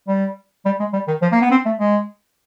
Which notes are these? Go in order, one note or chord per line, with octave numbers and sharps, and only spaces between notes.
G3
G3
G#3
G3
D#3
F3
A#3
B3
C4
A3
G#3